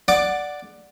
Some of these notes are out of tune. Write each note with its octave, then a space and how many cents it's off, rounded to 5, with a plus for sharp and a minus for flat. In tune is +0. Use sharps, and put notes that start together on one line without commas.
D5 +0 F#5 +0 D6 +10